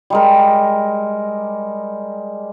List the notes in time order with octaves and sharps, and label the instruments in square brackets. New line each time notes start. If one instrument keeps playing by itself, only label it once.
[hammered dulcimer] G3 G#3 A#4